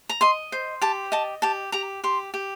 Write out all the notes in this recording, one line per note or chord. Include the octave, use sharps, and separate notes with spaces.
A#5
D#5 C6
C5
G4 A5
D#5 A5
G4 A5
G4 A#5
G4 C6
G4